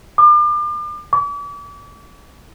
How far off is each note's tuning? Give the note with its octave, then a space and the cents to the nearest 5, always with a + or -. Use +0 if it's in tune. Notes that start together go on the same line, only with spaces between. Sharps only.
D6 +40
D6 -40